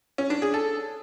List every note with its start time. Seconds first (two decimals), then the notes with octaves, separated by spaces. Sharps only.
0.18 C#4
0.30 D4
0.42 G#4
0.54 A4